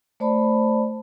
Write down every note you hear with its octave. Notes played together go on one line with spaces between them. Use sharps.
A3 C5 D5 A5 B5